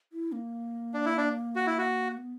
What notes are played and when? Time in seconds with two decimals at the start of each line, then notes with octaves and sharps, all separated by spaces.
0.13 E4
0.32 A#3
0.94 D4
1.06 E4
1.17 D4
1.56 F#4
1.67 E4
1.78 F#4
2.17 B3